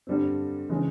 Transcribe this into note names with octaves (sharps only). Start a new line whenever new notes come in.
G2 D3 G3 C4
C#3 E3 G#3